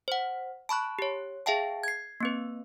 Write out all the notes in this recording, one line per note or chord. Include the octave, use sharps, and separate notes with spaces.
C5 F#5
A5 B5 C#6 F#6
G4 C#5
G#4 E5 F5 G5 A5
G#6 C7
A#3 C4 B4